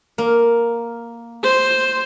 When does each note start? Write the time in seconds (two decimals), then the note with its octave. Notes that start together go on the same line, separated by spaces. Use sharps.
0.18 A#3
1.44 C5